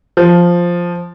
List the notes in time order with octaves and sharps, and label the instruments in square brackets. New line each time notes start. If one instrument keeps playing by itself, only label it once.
[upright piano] F3